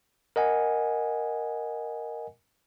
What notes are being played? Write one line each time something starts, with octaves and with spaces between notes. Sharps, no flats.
A#4 D#5 F#5 G#5